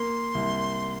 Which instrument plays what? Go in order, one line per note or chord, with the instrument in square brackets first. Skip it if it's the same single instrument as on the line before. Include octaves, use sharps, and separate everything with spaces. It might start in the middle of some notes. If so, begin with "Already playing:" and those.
Already playing: [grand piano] A#3 [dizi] C6
[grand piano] C2